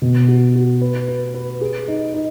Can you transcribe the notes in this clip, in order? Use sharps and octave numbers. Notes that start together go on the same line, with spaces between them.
B2
F#4
F#4
B4
B4
B4
G#4
D#4
D#4